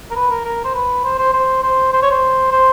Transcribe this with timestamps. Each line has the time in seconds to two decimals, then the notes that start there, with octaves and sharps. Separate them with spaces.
0.11 A#4
0.15 B4
0.30 A#4
0.45 A#4
0.64 C5
0.74 B4
1.04 C5
1.19 C5
1.34 C5
1.63 C5
1.93 C5
2.02 C#5
2.11 C5
2.52 C5